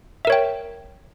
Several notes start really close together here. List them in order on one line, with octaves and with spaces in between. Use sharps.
E5 A#4 C#5 G5